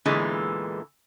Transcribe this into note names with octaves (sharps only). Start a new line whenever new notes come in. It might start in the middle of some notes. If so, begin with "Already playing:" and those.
E2 A#2 D3 E3 G#3